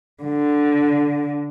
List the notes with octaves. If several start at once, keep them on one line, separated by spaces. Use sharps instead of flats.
D3